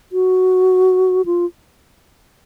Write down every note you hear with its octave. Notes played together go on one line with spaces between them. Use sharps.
F#4
F4